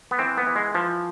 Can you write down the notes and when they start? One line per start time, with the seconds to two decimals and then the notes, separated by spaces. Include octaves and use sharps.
0.11 B3
0.19 E3 C4
0.37 B3
0.46 E3
0.56 G#3
0.75 E3 F3